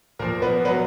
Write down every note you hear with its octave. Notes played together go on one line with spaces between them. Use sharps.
A#2 F3 A#3 A#4
B3 B4
F#3 B3 B4